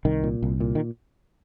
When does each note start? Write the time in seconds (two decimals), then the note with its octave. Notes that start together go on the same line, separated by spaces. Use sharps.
0.05 C2 D#3
0.23 A#2
0.43 C2
0.60 A#2
0.75 D#3